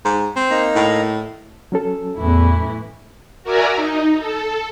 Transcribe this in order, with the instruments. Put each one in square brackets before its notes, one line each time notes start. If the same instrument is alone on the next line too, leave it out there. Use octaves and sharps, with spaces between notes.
[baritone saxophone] G#2
C4
[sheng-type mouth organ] A#3 D#4 A#5
[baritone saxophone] A2
[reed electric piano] F#3 C#4 A4
[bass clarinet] E2 [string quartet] A2 E3 E4
[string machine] F#4 A#4 D5 E5 G#5 A#5
D#4
A4